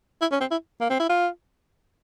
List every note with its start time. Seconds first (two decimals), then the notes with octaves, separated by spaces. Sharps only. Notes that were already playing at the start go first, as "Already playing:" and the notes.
0.22 E4
0.32 C#4
0.41 C4
0.51 E4
0.81 A#3
0.90 C4
1.00 E4
1.09 F4